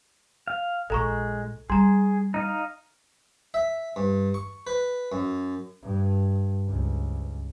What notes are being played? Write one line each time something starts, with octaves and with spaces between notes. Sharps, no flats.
F5
A#1 G#3 A4 A#5 C#6
G3 G#4 A#5 C6
D#4 D#5 F5
E5
G2
C#6
B4
F#2
G2
C#2